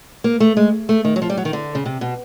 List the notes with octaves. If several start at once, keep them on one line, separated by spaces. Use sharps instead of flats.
A#3
A3
G#3
A3
D#3
F#3
F3
G3
F#3
D#3
D3
C#3
C3
B2